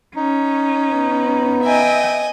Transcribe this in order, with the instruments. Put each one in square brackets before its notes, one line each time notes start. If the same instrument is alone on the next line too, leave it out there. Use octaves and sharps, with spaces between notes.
[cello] C#4 [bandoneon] D#4
[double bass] B3
[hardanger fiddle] D#5 G#5 [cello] E5 G5